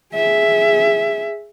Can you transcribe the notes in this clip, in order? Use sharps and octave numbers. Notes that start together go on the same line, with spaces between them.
G#4 E5